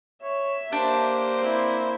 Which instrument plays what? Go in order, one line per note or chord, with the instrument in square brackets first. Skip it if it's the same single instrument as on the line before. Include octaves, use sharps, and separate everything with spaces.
[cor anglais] C#5 [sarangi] E5
[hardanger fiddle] A#3 C5 [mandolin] D4 [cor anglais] G4
[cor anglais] C4 [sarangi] E4